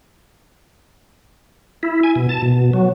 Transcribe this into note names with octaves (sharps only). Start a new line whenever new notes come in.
E4
G#5
B2
A5
B2
F#3